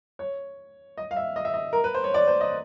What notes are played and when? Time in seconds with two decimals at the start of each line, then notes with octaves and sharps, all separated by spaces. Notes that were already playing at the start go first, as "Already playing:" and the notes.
0.19 C#5
0.98 D#5
1.11 F5
1.16 E5
1.36 D#5
1.45 E5
1.54 D#5
1.73 A#4
1.84 B4
1.95 C5
2.04 C#5
2.14 D5
2.28 C5
2.41 D#5